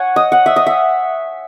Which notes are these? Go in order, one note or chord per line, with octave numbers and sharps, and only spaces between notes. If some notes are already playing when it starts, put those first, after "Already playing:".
Already playing: C#5 F#5 G#5
D#5
F#5
E5
D#5
E5